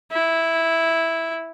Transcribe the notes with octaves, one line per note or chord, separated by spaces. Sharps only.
E4